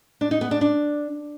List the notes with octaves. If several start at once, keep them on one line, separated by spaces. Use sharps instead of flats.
D4
D#4
B3
D4
D4